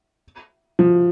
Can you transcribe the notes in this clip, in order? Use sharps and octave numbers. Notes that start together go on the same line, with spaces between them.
F3